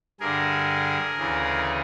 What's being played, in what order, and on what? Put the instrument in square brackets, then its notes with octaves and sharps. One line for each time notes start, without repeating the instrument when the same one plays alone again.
[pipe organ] G2 D3 G#4 A#4
D2 C#3 E3